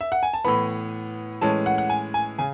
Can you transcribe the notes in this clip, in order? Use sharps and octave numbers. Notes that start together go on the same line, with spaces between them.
E5
F#5
G#5
A5
A2 E3 B3 B5
A2 E3 G#3 C#4 A5
F#5
F#5
G#5
G#5
C#3 G#5